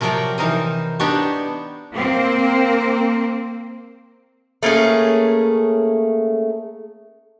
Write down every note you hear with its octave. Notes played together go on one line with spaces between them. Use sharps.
C3 F3 F#3 A#4 D5 G5
E3 D#4 A#4 C5 D#5
B3 D4 D#4 G4 C#5 A5
A#3 C4
A3 A#3 C#4 G#4